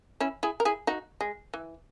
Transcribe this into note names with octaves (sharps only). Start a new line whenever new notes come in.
C#4 E4
E4 G#4
A#4
E4 G#4
D#4 F#4
G#3
E3